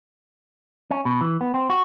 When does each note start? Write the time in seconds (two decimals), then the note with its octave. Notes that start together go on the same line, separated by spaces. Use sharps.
0.91 C#4
1.05 B2
1.21 E3
1.41 B3
1.54 C4
1.70 F#4